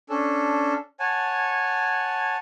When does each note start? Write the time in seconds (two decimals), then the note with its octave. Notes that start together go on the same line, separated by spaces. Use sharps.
0.09 C#4 D4 A4
1.00 C#5 F#5 G#5 A5